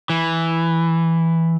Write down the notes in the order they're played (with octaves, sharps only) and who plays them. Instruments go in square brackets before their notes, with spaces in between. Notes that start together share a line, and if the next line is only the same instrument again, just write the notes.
[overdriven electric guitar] E3